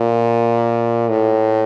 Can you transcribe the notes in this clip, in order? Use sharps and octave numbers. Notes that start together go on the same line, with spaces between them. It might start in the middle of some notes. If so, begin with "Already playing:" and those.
Already playing: A#2
A2